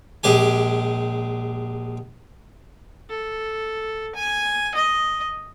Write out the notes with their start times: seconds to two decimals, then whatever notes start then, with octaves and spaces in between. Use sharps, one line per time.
0.24 A#1 G#3 G4 G#5
3.10 A4
4.15 G#5
4.74 D#5